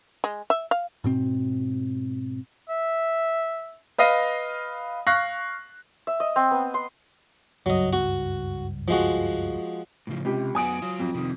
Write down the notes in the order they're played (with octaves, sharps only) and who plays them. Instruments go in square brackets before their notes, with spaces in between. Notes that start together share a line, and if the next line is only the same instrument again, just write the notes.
[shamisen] G#3
E5
F5
[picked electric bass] G#2 B2 C4
[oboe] E5
[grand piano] B4 D#5 F5 A#6 D#7
F5 C#6 F#6 A#6 C7
[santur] E5
D#5
C4
B3
C6
[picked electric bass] F#1 C#2 G2 [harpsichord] F#3 D#5
[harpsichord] F#4
F3 G#3 F#4
[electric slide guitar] A2 C#3 F3
[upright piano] C#2 G4 [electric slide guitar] C3
[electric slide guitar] F#2 B3 F#4 [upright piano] G#5 D#6 D7
[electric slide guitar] F#3 F4
[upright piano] F2
[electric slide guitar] C3 D#3